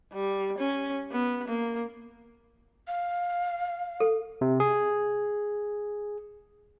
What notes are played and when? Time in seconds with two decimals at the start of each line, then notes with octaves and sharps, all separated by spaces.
0.13 G3
0.59 C#4
1.12 B3
1.48 A#3
2.87 F5
4.00 A4
4.41 C3
4.60 G#4